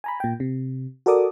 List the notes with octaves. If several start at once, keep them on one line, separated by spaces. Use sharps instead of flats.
G#5 A#5 B5
A#2 G5
C3
F#4 A4 A#4 D5 D6 D#6